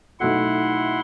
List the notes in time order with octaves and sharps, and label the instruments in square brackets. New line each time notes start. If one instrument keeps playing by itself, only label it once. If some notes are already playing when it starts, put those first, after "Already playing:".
[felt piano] B1 A3 F#4 [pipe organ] E4 F#5 C6